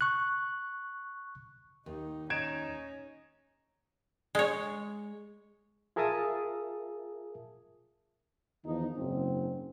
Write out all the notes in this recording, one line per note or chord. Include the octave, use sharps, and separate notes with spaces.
C#6 F#6
D#2 D#4
C#4 D#4 G#6 D7 E7
G#3 C#5
F4 G#4 A#4 E5 A5 D#6
E2 D#3 F3 D#4
F#1 G#2 C4